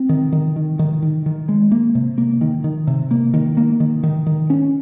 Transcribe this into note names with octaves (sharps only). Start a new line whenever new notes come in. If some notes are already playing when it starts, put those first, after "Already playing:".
Already playing: C4
D#3
D#3
D#3
D#3
D#3
D#3
G#3
A#3
C3
A#3
D#3
D#3
C3
A#3
D#3
A#3
D#3
D#3
D#3
C#4